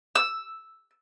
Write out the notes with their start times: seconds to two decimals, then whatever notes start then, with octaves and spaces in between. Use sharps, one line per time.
0.15 E6